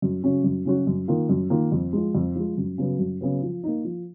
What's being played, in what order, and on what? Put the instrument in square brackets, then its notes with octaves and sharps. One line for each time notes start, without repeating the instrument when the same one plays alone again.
[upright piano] F#2
C#3 F#3 C#4 F#4
F#2
C#3 F#3 C#4 F#4
F#2
D#3 A#3 F4
F#2
D#3 A#3 F4
F2
F3 G#3
F2
F3 G#3
F#2
C#3 F#3 B3
F#2
C#3 F#3 B3
F3
A#3 D#4
F3